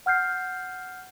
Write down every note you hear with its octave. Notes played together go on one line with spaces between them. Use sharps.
F#5 F6 G6 C7